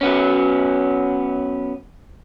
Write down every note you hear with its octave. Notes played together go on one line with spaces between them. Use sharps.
F#3 B3 C#4